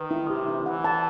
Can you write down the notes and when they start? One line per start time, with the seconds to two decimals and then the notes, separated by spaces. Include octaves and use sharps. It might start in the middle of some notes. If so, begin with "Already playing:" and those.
Already playing: D#3 B4
0.11 E4
0.30 C3 G4
0.48 E4
0.66 E3 F#5
0.84 A5